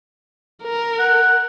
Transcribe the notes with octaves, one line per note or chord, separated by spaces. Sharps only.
A#4
F#5